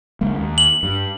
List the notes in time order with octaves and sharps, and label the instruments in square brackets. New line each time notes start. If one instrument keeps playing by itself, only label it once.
[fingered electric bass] C#2 G#3 A#3
D#2
[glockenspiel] F#7
[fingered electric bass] G2